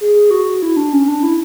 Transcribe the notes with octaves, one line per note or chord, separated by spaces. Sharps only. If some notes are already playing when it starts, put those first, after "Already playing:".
G#4
G#4
F#4
E4
D4
C#4
D4
E4